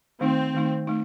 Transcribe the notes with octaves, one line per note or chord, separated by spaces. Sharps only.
D#3 A3 C4 D#4
D#3 A3 D#4
A3 D#4